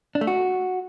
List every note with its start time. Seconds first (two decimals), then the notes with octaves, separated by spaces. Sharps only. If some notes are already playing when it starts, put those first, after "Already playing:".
0.15 D4
0.21 A3
0.27 F#4